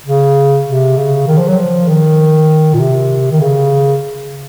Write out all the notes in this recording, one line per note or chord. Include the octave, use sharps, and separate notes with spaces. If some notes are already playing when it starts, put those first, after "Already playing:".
C#3
C3
C#3
D#3
F3
F#3
F3
D#3
A#2
C3
D#3
C#3